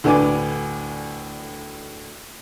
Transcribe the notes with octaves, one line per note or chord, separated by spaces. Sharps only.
D2 A2 D4 B4 G#5 D6